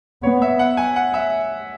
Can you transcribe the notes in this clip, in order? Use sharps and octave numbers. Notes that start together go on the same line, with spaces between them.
B3 C#5
E5
F#5
G#5
F#5
E5